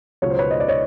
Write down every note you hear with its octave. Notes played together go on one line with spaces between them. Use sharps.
C#2 B2 F#3 C#5
C5
B4 C#5
D#5
D5
C#5 D#5